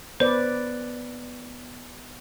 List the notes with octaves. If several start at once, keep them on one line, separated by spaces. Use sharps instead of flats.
B3 B4 C5 D5